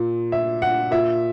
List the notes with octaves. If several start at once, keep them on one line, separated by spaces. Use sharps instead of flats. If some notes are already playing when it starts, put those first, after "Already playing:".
Already playing: A#2
E5
F#5
A#2 E5